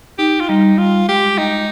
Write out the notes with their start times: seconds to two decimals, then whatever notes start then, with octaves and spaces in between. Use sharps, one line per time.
0.18 D#4 G4
0.41 F4
0.49 G3 D#4
0.78 G3 F4
1.08 G#3 G4
1.38 D#4